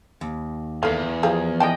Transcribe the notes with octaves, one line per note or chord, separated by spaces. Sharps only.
D#2
E2 A3 A#3 F5
F3 G4 G#4 A#4 F5
E3 B3 D#5 G5 A5